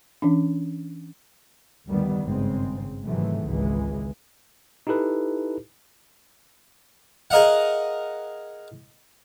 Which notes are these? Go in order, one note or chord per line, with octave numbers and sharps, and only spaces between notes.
E3 C#4 D4
D2 G2 D#3 E3 G3 B3
G#1 G2 C#3 G#3 C4
G#2 C3 D#3 E3 F#3 A3
G#1 C#2 E3 G#3
D#4 E4 G4 A4 B4
G#4 A#4 D#5 F5 F#5